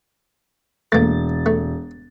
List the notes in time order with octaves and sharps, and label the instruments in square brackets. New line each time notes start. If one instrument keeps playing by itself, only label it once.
[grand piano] E1 A6 [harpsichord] A3 A#3
[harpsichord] A3